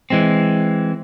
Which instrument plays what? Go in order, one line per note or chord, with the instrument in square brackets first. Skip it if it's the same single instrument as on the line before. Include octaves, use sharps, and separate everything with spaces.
[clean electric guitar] E3 G#3 C4